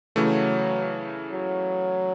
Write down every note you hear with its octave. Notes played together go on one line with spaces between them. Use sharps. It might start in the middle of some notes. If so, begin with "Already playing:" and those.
C#3 E3 F#3 A3
F#3